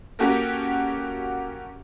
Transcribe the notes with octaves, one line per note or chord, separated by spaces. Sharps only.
A#3 C#4 F#4 G4 A4 A#4